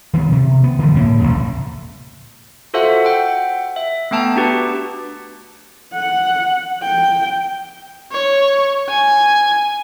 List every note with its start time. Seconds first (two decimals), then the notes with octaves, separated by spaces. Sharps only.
0.14 D#3 B3
0.32 C3
0.64 B3
0.79 D3 E3 F3 G3
0.94 D2 A2 G3 A#3
1.19 A1 A2 C#3
2.74 F4 F#4 A4 C5 E5 F#5
3.05 F#5 G5
3.76 E5
4.11 A3 B3 G5 A5 A#5
4.36 D4 F#4 G4 B4
5.93 F#5
6.83 G5
8.12 C#5
8.90 G#5